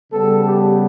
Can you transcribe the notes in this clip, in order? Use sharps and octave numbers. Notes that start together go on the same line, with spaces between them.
C#3 G3 B3 A4
G4